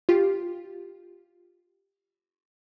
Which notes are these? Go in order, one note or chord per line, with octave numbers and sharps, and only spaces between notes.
F4 G4